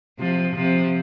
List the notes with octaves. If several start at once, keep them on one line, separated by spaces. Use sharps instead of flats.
C3 F3
C3 F3